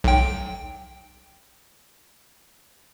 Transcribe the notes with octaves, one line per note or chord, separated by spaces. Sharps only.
B1 G5